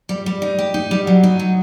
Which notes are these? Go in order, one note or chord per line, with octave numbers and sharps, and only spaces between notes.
G3
G3
D#4
G4
D#4
G3
F#3
D#4
F#3